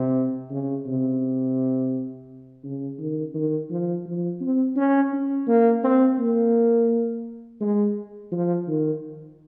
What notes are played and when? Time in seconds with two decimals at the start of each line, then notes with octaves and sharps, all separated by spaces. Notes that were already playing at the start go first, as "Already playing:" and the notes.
Already playing: C3
0.50 C#3
0.87 C3
2.64 C#3
2.99 D#3
3.34 D#3
3.70 F3
4.05 F3
4.41 C4
4.76 C#4
5.13 C#4
5.47 A#3
5.84 C4
6.19 A#3
7.61 G#3
8.32 F3
8.68 D#3